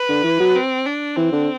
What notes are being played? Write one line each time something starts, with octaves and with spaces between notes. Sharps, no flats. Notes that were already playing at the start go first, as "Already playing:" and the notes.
Already playing: B4
D3
E3
F#3
C4
D4
E3 C4
D3